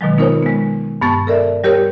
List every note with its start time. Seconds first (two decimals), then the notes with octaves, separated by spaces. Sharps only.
0.01 B2 D#3 F#3 G#3
0.18 B3 D#4 F4 A#4 C5 C#5
0.43 G#3 B3
1.02 G2 B3 A5 C#6 A6
1.27 A4 A#4 D5 E5
1.64 G3 G4 A#4 C#5